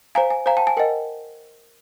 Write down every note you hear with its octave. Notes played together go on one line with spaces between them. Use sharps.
C5 F5 G#5 A#5
G#5
C5 F5 G#5 A#5
G5 A5
G#5
A#4 D#5 F#5 G5